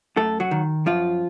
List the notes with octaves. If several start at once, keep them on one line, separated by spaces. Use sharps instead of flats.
F#2 A3 A4
F#3 F#4
D#3
F#2 F3 F4